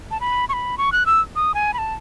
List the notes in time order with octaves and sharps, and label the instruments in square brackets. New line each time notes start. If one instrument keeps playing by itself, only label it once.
[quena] A5
B5
C#6
B5
C#6
F#6
E6
D#6
G#5
B5
A5